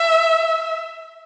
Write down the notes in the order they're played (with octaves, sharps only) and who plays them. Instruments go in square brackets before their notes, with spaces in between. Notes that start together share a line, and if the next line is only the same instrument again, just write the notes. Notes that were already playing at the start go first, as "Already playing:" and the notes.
Already playing: [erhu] E5